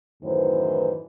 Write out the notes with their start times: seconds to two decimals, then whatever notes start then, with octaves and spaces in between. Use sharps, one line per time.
0.23 F#2 A2 D#3 E3 B4 C5